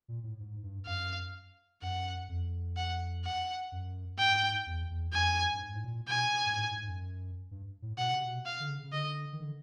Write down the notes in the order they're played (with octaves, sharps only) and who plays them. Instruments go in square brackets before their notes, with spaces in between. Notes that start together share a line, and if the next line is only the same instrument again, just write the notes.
[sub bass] A#2
A2
G#2
G2
[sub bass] F#2 [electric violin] F5
[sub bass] F#2 [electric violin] F#5
[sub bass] F2
[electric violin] F#5
F#5
[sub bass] F#2
[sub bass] G#2 [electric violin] G5
[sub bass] E2
E2
[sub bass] F2 [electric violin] G#5
[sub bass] G2
G#2
A2
A#2
[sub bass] B2 [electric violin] G#5
[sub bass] G#2
A2
G#2
F#2
G2
A2
[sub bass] B2 [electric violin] F#5
[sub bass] C3
B2
[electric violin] F5
[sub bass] D3
C#3
C#3
[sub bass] D3 [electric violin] D#5
[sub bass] D#3
D3